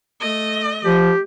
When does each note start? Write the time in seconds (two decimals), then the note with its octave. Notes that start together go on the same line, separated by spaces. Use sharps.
0.20 A3 D#5
0.85 F3 G4